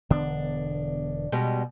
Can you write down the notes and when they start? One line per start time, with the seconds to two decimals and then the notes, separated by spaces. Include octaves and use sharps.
0.10 E1 D3 B3 D4
1.32 B2 G3 G#3